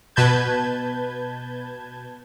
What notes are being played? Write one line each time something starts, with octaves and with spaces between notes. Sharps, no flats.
B2 B4 A5 G6 G#6